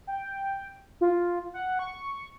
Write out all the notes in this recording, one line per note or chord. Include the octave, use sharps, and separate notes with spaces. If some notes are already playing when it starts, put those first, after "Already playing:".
G5
F4
F#5
C#6